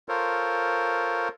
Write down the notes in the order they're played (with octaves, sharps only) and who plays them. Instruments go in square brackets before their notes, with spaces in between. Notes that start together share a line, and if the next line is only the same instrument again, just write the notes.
[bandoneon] F4 A4 A#4 C5 C#5